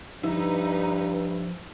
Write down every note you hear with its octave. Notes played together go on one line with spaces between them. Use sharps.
G2 F3 D#4 E4 B4